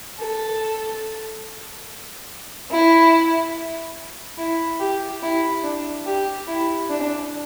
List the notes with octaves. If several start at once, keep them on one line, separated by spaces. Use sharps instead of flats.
A4
E4
E4
G4
E4
D4
G4
E4
D4